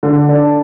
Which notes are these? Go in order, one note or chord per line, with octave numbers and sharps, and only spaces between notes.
D3
D4